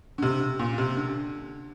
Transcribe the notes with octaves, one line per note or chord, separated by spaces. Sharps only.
D3
C3
A#2
C3
D3